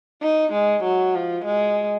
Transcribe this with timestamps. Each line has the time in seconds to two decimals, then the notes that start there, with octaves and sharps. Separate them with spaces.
0.23 D#4
0.53 G#3
0.84 F#3
1.16 F3
1.45 G#3